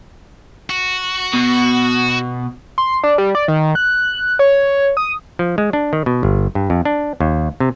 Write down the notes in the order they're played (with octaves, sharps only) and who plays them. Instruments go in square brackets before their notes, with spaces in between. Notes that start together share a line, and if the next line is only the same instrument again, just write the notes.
[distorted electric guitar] F#4
[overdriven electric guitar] B2
[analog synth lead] C6
D4
G3
D5
D#3
F#6
C#5
D#6
[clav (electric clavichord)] F3
G#3
D4
D#3
B2
G1
G2
F2
D4
D#2
C3